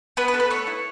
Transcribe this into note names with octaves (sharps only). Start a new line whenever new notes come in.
B3 B4
B4
A4
B4
A3 C#5
E4